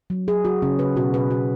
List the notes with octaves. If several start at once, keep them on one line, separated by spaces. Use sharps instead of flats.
F#3
F#3 G#4
F#3 F#4
C#3 C#4
C#3 B4
B2 F#4
B2 B4
B2 F#4